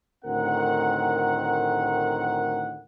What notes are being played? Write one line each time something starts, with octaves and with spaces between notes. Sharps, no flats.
D2 A2 D#3 C4 A#4 F#5